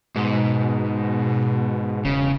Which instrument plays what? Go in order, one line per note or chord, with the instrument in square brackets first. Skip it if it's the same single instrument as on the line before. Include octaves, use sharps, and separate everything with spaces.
[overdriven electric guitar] G#2 [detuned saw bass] B2
[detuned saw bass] E1 [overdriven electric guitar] C#3